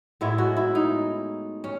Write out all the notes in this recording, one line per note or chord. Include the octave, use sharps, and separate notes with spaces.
A2 G#3 B3 E4
F#4
E4
D#4
C#4